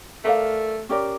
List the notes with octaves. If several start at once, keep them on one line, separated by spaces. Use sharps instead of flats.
A3 A#4 D5 F5
C#4 G4 A#4 D5